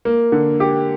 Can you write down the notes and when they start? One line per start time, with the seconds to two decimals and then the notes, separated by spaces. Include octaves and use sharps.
0.05 A#3
0.32 D3
0.60 G4